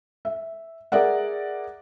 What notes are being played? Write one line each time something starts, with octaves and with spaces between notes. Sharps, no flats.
E5
G#4 A#4 D5 E5 F#5